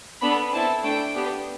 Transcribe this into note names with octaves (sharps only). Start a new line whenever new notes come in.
B3 D4 A4 B5
C4 E4 A4 A5
A3 D4 A4 G5
B3 D4 G4